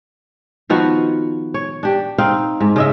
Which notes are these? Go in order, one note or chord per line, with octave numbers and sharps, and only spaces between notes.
D#3 F3 B3 F#4
C#5
D4 G4
C4 D#4 F5
G#2
C#3 D#5 E5